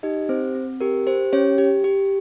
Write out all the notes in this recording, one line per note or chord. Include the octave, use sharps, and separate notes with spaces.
D#4 G4 D#5
C4 C5
C4
G4 A#4
G4 C5
C#4 G4 C#5
G4
G4